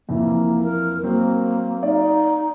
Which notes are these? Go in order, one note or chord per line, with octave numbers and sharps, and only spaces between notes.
F2 E3 A#3
A#4
F#3 A#3 C4
D#4 D5 F5